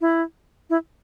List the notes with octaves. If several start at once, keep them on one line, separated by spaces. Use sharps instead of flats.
E4
E4